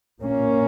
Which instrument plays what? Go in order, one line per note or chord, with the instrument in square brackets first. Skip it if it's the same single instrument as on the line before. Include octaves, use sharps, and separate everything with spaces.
[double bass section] A#2 A#3 C#4